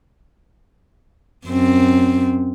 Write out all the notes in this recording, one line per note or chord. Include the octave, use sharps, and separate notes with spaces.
F#2 C4